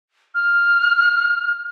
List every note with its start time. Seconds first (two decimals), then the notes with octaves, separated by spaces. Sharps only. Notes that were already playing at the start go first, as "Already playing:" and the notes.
0.34 F6